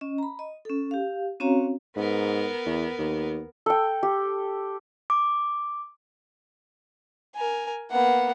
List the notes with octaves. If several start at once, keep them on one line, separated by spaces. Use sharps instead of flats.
C#4 D#5
A#5 B5
D#5
C#4 A4
G4 F5
C4 C#4 F#4 C#5 F5 A#5
G#2 B3 A#4
E2
D#2
A4 G5
G4
D6
A#4 G#5
A#3 B3 F#5